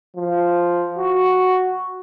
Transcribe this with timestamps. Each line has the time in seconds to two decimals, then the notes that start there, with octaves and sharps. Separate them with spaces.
0.16 F3
0.98 F#4